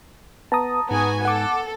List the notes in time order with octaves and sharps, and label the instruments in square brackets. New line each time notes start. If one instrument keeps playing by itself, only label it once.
[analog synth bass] B3 [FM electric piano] A5 A#5 D#6
[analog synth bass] G#2 [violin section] B3 F#4 G#5
[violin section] A4 [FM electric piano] F#5 D6